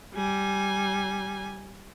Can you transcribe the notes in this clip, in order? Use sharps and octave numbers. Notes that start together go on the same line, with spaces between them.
G3 G#5